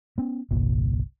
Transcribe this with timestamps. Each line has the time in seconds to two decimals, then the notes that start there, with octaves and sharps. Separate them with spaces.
0.18 B3 C#4
0.51 G1 C2 A#2